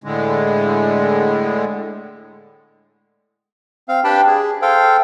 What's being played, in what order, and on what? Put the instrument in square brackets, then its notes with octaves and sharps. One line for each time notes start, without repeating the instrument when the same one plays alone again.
[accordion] A2 D3 G#3
[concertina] C4 F5
D4 G4 B4 G5 A5 B5
G#4
A4 C5 F5 G5